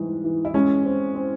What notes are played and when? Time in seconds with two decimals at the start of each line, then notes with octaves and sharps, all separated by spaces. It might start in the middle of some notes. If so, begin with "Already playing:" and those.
Already playing: G#2 E3 G3
0.24 E3
0.45 E4
0.54 G#3 C#4
0.85 C4
1.15 C4